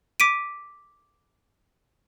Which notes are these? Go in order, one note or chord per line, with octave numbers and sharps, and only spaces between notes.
D6 B6 D7 D#7